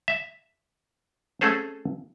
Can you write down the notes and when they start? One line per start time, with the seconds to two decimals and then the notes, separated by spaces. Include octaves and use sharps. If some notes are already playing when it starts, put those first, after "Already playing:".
0.08 E5
1.41 A3 C4 C#4 G#4 A4 C5